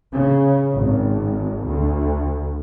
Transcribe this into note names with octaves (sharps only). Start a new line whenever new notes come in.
C#3
G#1
D2